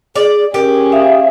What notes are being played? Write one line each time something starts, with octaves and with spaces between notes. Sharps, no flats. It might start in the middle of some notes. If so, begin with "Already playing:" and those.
G#4 D5
C#4 G4 G#4 A#4
E5 F5 D#6